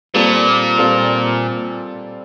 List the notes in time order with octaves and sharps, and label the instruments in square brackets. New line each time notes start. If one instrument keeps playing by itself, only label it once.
[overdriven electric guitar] A#2 [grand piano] G3 C4 F4 A4 D5
[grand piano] G3 C4 F4 A4 D5